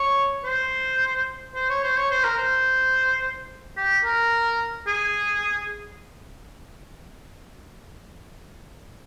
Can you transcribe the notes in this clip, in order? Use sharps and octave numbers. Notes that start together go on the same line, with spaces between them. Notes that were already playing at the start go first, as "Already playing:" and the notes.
Already playing: C#5
C5
C5
C#5
C5
C#5
C5
A#4
C5
G4
A#4
G#4